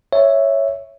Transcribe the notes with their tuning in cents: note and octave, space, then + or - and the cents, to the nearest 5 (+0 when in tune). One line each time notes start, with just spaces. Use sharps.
C#5 +0 E5 +0